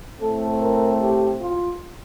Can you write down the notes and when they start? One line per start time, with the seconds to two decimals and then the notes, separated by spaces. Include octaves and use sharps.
0.20 A2 A3 C4 A4
0.61 A#4
1.00 G4
1.40 F4